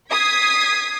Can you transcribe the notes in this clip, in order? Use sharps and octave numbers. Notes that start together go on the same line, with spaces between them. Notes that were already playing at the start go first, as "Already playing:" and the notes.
D#6 G#6 B6 C7